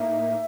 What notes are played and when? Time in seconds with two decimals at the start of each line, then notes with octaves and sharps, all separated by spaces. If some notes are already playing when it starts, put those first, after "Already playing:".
Already playing: A2 A#3 D#4 E5